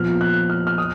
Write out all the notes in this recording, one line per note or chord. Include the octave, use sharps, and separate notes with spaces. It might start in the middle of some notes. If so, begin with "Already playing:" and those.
Already playing: A#2 F3 B3 F6
F#6
F6
F6
D#6